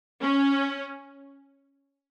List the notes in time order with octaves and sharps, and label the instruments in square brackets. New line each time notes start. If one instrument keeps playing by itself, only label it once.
[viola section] C#4